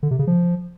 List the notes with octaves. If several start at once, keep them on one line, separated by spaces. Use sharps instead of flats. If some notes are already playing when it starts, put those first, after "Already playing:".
D3
C3
C#3
F3